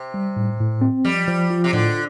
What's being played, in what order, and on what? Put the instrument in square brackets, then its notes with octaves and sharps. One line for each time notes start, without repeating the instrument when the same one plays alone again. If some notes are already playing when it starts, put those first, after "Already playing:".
Already playing: [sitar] C3
[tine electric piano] G3
A2
A2
C4
[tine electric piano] F3 [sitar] G3
[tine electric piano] F3
F4
[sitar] C3
[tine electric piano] A2 [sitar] D3